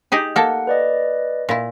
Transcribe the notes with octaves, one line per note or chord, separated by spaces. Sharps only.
D#4 G4 G#4
A#3 A4 F#5
B4 D5 D#5
A#2 E4